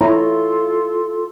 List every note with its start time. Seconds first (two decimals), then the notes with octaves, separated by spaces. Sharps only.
0.01 E4 F4 A4 C#5 A#5 C6